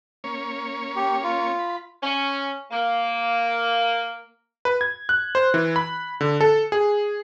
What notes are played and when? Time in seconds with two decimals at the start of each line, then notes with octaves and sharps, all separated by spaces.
0.24 A#3 C#4 C#5
0.96 G4
1.24 F4
1.59 B5
2.03 C#4
2.71 A#3
4.65 B4
4.81 G#6
5.09 F#6
5.35 C5
5.54 E3
5.76 B5
6.21 D3
6.41 A4
6.72 G#4